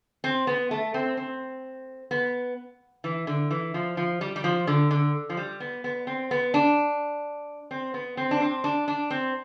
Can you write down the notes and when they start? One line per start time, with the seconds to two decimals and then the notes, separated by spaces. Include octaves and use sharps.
0.24 C4
0.47 B3
0.71 A3
0.94 C4
1.17 C4
2.11 B3
3.04 E3
3.27 D3
3.50 E3
3.74 F3
3.97 F3
4.21 G3
4.36 G3
4.44 F3
4.67 D3
4.91 D3
5.30 F3
5.37 G3
5.60 B3
5.84 B3
6.07 C4
6.31 B3
6.54 D4
7.71 C4
7.94 B3
8.17 C4
8.31 D4
8.40 C4
8.64 D4
8.88 D4
9.10 C4